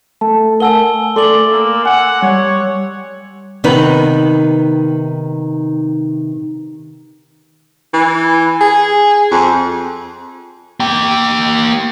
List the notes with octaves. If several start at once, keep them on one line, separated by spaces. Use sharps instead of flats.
A3 A5
A#4 F#5 G#5 A5 E6 G7
A3 A4 D5 C6 D6 F#7
A#3 E6
F#5 G#5
G3 C#5
C3 D#3 B3 D#4 B4
E3
G#4
F2
A#3 G5